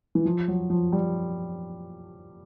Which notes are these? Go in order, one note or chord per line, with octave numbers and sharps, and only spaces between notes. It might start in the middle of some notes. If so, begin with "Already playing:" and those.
E3
F3
F#3
F3
G3